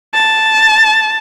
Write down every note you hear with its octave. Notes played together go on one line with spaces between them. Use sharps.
A5